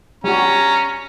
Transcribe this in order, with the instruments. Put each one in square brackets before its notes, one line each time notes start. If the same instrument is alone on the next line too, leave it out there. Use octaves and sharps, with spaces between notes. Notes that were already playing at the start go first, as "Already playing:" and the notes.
[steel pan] G3 F#4 [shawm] C#4 [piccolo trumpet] A#5